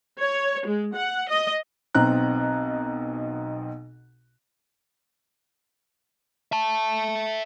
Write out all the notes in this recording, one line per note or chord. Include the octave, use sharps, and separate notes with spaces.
C#5
G#3
F#5
D#5
B1 B2 C4 A#5 F#6
E5 A5